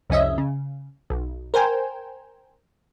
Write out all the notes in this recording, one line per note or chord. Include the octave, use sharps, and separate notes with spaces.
C2 F2 C#4 D#5 E5
C#3
B1
A#4 C5 G5 G#5